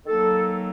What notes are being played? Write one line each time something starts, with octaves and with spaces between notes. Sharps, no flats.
D#3 F#3 A#3 A4